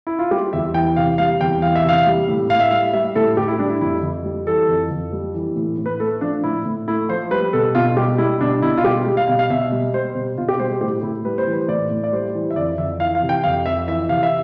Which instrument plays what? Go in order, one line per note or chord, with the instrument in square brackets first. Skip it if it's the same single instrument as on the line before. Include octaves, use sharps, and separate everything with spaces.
[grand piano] E4
F4
G3 G4
E2 E5
E3 G5
C3 F5
G3 F5
E2 G5
E3 F5
E5
C3 F5
G3
A2
A2 F5
E5
G3 F5
G3 E5
A2 A4
A2 G4
E4
G3 D4
E4
F2 E4
F2
G3
E3 A4
F2
F2
G3
E3
A2
A2
B4
A3 A4
F3 D4
A2 E4
A2
A3 E4
F3 C5
G3 B4
B2 A4
B2 F4
G3 G4
G3 E4
B2 D4
B2 E4
F4
G3 G4
G3
F5
B2 F5
F5
B2 E5
G3
G3 C5
B2
B2 F4
G4
G3 C5
A2 G4
A2 E4
G3 B4
C5
E3
B4
A2 D5
A2
D5
G3 C5
E3
E5
F2 D5
F2 E5
E3 F5
F5
C3
G5
F2 F5
F2 E5
E3 E5
C3 F5
E5